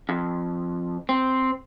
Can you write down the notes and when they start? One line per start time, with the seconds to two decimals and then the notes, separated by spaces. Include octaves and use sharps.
0.09 F2
1.09 C4